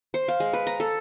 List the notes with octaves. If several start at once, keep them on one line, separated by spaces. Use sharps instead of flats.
C5
F5
G#3
B4
A#5
A4